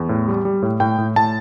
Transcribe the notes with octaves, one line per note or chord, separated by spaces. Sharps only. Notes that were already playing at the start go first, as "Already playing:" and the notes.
Already playing: E2
A2
G3
G3
A2
A2 G5
A2
A2 A5